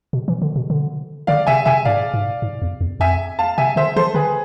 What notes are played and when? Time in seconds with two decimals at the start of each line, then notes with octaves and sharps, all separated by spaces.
0.13 B2
0.28 E3
0.42 D3
0.56 B2
0.70 D3
1.27 D3 D5 F5
1.47 C3 E5 G#5
1.66 C3 E5 G#5
1.85 G#2 D5 F5
2.14 G#2
2.42 G#2
2.62 E2
2.81 E2
3.00 F2 E5 G#5
3.39 F5 A5
3.58 C3 E5 G#5
3.76 D3 C5 E5
3.96 E3 A4 C5
4.14 D3 G#4 B4